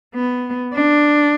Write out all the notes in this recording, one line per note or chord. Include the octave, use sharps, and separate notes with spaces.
B3
D4